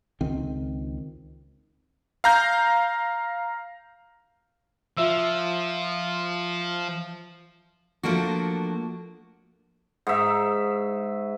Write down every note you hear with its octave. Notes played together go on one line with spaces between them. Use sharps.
C#2 D#3 C4
F5 A#5 G6
F3 F4 E5 E6
F3 A3 A#3 D4 F#4
G#2 E5